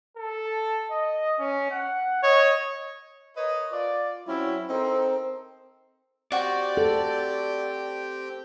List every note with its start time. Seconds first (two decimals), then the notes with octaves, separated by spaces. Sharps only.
0.17 A4
0.91 D#5
1.39 C#4
1.71 F#5
2.23 C#5 D#5
3.36 A#4 B4 C#5 D#5
3.72 F4 D5
4.27 F#3 C4 C#4 E4
4.70 C4 D#4 A4 A#4 C5
6.32 C4 F#4 G4 D5 G5
6.77 A4